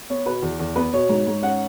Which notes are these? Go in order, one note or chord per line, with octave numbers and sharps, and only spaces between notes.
B3 C#5
B2 B4
E2
E2
B3 B4
B2 C#5
G#2
G#2
C#4 F#5